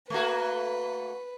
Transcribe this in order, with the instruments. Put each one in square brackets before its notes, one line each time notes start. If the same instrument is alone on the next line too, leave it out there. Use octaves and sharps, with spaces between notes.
[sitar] A3 A#3 F#4 [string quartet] B4